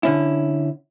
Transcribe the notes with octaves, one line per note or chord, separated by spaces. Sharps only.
D3 C#4 E4